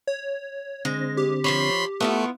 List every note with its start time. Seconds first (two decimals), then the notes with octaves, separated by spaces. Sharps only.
0.07 C#5
0.85 D3 G#3 C4 A#6
1.17 G4
1.44 F3 C5 C#5 B5 C6 B6
2.00 A3 B3 E4 F4 C#6